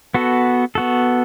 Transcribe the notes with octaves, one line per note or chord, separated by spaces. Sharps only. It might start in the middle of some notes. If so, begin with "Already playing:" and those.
B3 F#4 A4
B3 F#4 A4